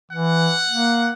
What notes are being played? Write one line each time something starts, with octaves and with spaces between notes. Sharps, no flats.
E3 F#5
A#3